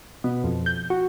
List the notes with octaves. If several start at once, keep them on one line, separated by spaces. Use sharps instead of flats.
B2
F2
G6
F#4